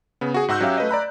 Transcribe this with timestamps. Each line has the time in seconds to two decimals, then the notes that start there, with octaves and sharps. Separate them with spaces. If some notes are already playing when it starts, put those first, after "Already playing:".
0.21 C#3 B3
0.34 F#4 G#4
0.48 G#2 F#4 F#5 E6 F#6 G6
0.61 F#3 C#4 G4 E5 F5
0.78 A3 B4 D#5
0.89 D5 A#5 B5 F#6